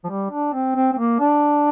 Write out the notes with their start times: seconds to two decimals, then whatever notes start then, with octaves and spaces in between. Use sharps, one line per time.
0.04 F3
0.09 G3
0.30 D4
0.53 C4
0.76 C4
0.93 C4
0.98 A#3
1.20 D4